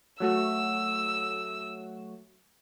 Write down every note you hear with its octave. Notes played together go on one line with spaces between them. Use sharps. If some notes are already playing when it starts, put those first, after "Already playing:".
F#3 A3 F#4 E6